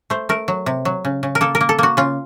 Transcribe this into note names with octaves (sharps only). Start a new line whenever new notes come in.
A3 C5
A3 A#4
F#3
C3
F#3
C#3
C#3
A#4
A#3 A4
A#4
A#3
A4
A#3 F#4
C#3 F4